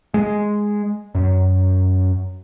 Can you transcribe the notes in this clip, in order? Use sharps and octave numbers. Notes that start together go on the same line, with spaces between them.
G#3
F#2